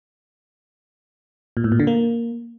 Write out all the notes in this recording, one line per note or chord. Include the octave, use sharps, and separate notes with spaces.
A#2
A2
A#2
D3
A#3